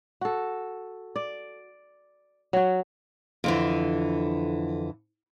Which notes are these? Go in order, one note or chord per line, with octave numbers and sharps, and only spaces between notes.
F#4 A4
D5
F#3 F#4
F2 D3 E3